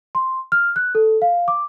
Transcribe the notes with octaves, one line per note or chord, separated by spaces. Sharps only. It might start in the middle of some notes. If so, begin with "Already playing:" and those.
C6
F6
F#6
A4
F5
D6